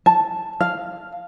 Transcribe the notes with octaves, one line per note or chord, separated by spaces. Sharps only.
A5
F5